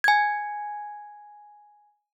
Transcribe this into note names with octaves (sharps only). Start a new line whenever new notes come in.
G#5 G#6